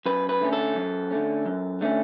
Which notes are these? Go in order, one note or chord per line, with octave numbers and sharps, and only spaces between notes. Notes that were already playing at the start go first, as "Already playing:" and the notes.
F#2 B4
B4
D3 A3 C#4
A4
F#2
D3 A3 C#4
F#2
D3 A3 C#4